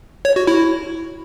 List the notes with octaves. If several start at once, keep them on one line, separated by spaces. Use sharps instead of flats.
C#5
F#4
E4